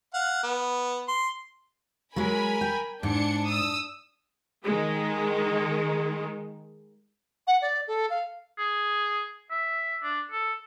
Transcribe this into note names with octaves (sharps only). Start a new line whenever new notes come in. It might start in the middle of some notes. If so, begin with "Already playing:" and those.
F5 F#5
B3
C6
F#3 G#3 A#4 G#5 B5
G5
G#2 D4 C#7
D#6 E6
D#3 G#3
F#5
D5
A4
F5
G#4
E5
D4
A4